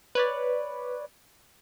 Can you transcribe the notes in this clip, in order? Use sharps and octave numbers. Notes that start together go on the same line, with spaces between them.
B4 C#5 D5